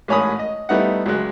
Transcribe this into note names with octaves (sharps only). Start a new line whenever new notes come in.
A1 G#2 C#5 G#5 B5 D#6
D#5
G3 A3 B3 D#4 E4 F#5
C#2 F#3 G#3 F#6